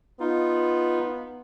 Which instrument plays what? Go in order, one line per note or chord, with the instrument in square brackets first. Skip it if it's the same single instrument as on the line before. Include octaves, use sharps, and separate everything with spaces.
[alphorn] B3 [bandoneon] D#4 F4